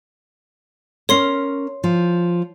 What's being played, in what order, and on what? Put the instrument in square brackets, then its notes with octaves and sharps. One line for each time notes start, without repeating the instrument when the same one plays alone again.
[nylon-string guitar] C#4 A#4 [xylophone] C#5 C6 C7
[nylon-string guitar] F3